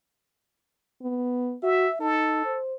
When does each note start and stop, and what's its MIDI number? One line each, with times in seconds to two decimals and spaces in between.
1.02 1.55 59
1.63 1.87 66
1.63 1.96 76
2.00 2.44 63
2.00 2.58 69
2.45 2.75 72